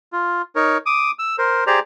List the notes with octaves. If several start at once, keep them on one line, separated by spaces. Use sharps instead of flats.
F4
D#4 A#4 C#5
D6 D#6
E6
A#4 C5
G4 G#4 C5 D5 A#5